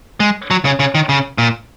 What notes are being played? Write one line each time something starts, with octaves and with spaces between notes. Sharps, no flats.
G#3
F#3
C#3
C#3
D#3
C#3
A#2